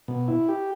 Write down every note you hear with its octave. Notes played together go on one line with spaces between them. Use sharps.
B2
E4
G4